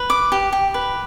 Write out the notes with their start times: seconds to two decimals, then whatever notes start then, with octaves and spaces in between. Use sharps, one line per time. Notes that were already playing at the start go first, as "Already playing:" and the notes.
Already playing: B4
0.10 D6
0.32 G4
0.52 G4
0.74 B4